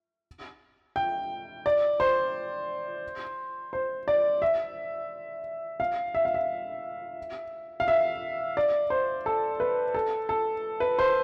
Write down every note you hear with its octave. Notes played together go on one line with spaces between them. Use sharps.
G5
D5
C5
C5
D5
E5
F5
E5
F5
E5
F5
E5
D5
C5
A4
B4
A4
A4
B4
C5